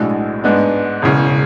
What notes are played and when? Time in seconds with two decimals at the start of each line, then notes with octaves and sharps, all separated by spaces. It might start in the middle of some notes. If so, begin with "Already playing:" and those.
Already playing: B1 A2 G#3 D4 F#4
0.44 G#2 G#3 B3 D4
1.02 E1 E2 C#3